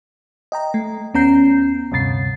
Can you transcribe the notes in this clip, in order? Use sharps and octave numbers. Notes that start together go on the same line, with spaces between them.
D#5 G5 A#5
A3
D#2 B3 C#4 A#5 G6 C7
D2 G2 C3 A6 C7